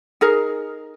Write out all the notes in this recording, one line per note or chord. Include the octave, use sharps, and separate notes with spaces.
D#4 G#4 A#4